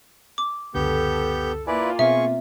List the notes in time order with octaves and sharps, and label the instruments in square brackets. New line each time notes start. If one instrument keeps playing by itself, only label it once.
[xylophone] D6
[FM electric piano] C#2 F#2 D3 [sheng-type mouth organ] B3 G4 G6 [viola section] A4
[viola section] A#3 F4 [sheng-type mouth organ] E4 B4 D5 [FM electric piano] G#5 C6 D6
[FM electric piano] B2 B3 C4 [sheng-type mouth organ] G#4 C#6 [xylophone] E5